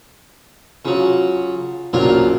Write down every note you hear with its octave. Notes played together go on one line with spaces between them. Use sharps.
C#3 F#3 F4
A#1 A#2 C#3 F#3 F4 A#4